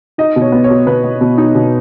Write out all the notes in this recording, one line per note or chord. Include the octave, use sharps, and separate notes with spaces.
D#4 D#5
B2
C#5
B3
C#5
B2
B2 B4
B3
B2
D#4
B2